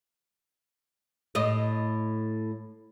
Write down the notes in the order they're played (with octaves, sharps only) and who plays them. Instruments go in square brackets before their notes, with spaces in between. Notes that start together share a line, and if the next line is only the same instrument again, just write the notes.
[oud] A2 D#5